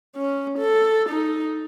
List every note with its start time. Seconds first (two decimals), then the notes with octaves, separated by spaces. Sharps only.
0.16 C#4
0.58 A4
1.09 D#4